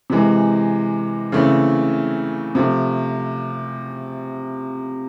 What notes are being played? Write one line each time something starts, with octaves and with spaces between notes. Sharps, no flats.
C3 E3 G#3
C#3 E3 A3 C4
C3 F3 A3